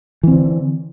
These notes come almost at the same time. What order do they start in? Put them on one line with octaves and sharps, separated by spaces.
E3 C4 D3